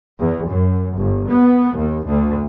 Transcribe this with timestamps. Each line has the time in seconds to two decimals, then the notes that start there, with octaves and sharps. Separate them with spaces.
0.18 E2
0.47 F#2
0.95 G1
1.28 B3
1.74 D#2
2.06 D2